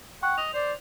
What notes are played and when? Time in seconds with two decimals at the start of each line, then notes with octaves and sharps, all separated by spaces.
0.22 F#5 G5 C#6 F#6
0.38 D#5 F7
0.54 C5 D5